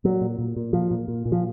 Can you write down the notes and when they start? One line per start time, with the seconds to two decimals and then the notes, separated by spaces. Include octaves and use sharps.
0.04 A#2 F#3
0.21 A#2
0.39 A#2
0.56 A#2
0.73 A#2 F3
0.91 A#2
1.08 A#2
1.25 A#2
1.32 F3